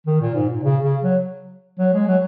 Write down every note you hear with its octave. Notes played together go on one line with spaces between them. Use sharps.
D#3
A#2
G#2
A#2
C#3
C#3
F#3
F#3
G#3
F#3